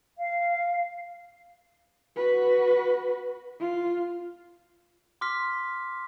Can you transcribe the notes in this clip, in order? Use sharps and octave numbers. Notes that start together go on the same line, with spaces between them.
F5
F#4 B4
F4
C6 D6 F6 B6